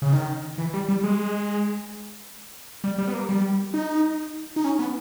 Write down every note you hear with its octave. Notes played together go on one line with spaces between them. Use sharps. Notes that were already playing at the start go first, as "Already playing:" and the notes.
C#3
D#3
E3
G3
G3
G#3
G3
G3
B3
A#3
G3
D#4
D#4
C#4
B3